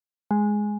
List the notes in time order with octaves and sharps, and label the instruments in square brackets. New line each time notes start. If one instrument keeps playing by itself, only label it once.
[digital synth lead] G#3